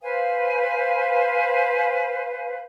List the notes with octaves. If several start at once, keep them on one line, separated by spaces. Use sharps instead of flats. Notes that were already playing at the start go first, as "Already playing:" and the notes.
B4 C5 F5 G#5